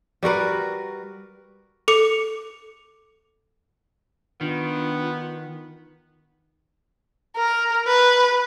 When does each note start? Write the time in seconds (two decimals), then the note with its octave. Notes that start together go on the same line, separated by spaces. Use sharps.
0.23 G3 F#4 A#4 B4
1.88 A4 D6 C#7
4.41 D#3 B3 D4 F4
7.37 A#4
7.87 B4